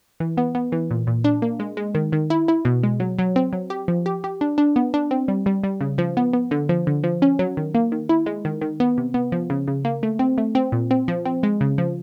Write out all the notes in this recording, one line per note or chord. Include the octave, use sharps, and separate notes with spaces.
E3
B3
B3
E3
A#2
A#2
D4
A#3
G#3
G#3
D#3
D#3
E4
E4
B2
G#3
F#3
F#3
C4
F#3
G4
F3
G4
G4
D4
D4
B3
D4
C4
G3
G3
G3
C#3
F3
B3
B3
D3
F3
D3
F3
C#4
F#3
D#3
A#3
D#3
E4
G#3
D#3
D#3
B3
C3
B3
F3
C#3
C#3
A#3
A3
C4
A3
C4
A#2
C4
F3
C4
G#3
C#3
F3